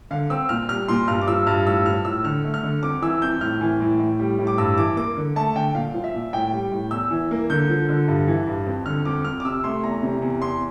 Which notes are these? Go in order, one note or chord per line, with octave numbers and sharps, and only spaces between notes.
D3 F5
C4 E6
A#2 F6
G3 F6
A#2 C6
G2 F6
D6
F3 E6
G2 F6
A2 E6
F3 F6
A2 E6
D3 F6
A3
F6
D3
F2 D6
E3 E6
F2 G6
A2 F6
E3
A2
A2
G3
A2
D6
G2 E6
E3 D6
A#3 D6
D3
A3 A5
D3 G5
A#2 F5
F3
E5
A#2
A2 G5
G3
A2
E2 E6
E3
A#3
D3 G6
F3
D3
G2
E3
G2
F2
D3 F6
F2 D6
F2 F6
D6
C3 E6
A3 C6
E2 A#5
C3
E2
E2 C6